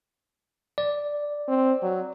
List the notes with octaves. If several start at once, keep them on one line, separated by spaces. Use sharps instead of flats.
D5
C4
F#3